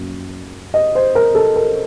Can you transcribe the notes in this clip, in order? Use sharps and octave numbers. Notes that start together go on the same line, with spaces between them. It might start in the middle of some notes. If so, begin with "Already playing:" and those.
Already playing: F#2 F#3 A#3
D#5
C5
A#4
A4
A#4